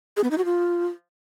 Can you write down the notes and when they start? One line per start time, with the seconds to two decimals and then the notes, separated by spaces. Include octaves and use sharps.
0.17 G#4
0.24 B3
0.31 D#4
0.38 F#4
0.45 F4